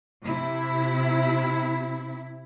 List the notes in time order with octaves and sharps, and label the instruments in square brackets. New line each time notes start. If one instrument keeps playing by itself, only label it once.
[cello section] C3 E4